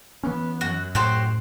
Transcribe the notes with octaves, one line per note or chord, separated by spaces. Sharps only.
E3 B3 C#4
F#2 F#4
A2 F#4 G4 C5